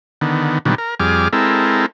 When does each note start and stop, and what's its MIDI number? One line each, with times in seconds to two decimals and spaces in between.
0.21 0.58 50
0.21 0.58 51
0.21 0.58 59
0.65 0.75 46
0.65 0.75 50
0.65 0.75 51
0.65 0.75 54
0.65 0.75 55
0.65 0.75 59
0.78 0.95 70
1.00 1.28 41
1.00 1.28 55
1.00 1.28 68
1.00 1.28 86
1.00 1.28 89
1.33 1.86 56
1.33 1.86 60
1.33 1.86 64
1.33 1.86 69
1.33 1.86 70